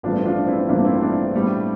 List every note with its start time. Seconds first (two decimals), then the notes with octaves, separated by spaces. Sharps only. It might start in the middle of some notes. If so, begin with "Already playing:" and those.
0.03 A1 G2 F3 A3 D4 F4
0.25 D4 F4
0.47 C4 E4
0.69 A1 G2 F3 A3 A#3 D4
0.85 C4 E4
1.01 D4 F4
1.34 A2 G3 D4